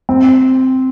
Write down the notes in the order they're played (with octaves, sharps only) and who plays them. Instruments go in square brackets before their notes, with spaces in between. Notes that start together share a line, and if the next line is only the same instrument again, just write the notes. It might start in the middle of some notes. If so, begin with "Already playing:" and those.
[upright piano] C4